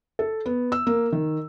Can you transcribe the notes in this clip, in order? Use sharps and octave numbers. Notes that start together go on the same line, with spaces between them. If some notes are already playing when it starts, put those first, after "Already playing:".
A4
B3
E6
A#3
D#3